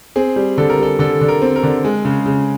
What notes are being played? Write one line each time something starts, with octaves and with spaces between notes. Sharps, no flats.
C4 G#4
G3
D3 A4
A#4
G3 A4
D3 A4
D3
A#4
C4
A#4
D3
G#3
C#3
C#3